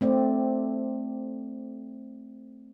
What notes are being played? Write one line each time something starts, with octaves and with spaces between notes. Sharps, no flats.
A3 C4 D5